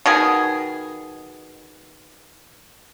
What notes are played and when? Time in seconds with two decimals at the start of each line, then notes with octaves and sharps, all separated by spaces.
0.06 B2 D#3 G#4